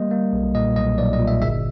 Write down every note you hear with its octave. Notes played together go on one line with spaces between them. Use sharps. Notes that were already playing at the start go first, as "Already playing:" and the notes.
Already playing: G3 A#3 D#5
A#3
B1
A#2 D#5
B1 D#5
B1 D5
D#5
A#2
E5
G1 E5